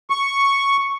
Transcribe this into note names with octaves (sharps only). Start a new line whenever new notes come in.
C#6